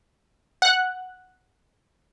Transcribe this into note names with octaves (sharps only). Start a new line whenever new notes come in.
F#5 F#6